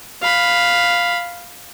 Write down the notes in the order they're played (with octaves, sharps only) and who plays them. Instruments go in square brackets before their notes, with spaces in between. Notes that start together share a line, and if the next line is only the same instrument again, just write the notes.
[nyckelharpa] F5 B5